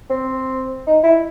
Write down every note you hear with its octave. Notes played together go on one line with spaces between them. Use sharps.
C4
D#4
E4